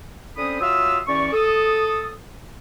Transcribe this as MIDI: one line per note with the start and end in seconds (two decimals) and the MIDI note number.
0.37 0.58 50
0.37 0.58 60
0.37 0.58 61
0.37 0.58 72
0.37 0.58 83
0.37 0.58 87
0.61 0.99 54
0.61 0.99 65
0.61 0.99 76
0.61 0.99 77
0.61 0.99 87
0.61 0.99 88
1.07 1.29 40
1.07 1.29 52
1.07 1.29 61
1.07 1.29 74
1.07 1.29 85
1.33 2.13 69
1.33 2.13 87